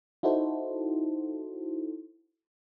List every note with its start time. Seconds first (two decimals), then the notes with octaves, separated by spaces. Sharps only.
0.23 D#4 E4 F#4 A4 C5